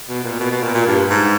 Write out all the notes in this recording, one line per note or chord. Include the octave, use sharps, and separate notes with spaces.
B2
A#2
B2
B2
A#2
A#2
G2
G#2